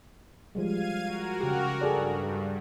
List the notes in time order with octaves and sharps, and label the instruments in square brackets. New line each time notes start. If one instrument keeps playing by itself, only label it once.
[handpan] F3 G3 G#3 [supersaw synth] F5 G#6 D#7
[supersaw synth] F#4 A#4
[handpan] C#3 G4
[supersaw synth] G2 [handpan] G#4 A4 D5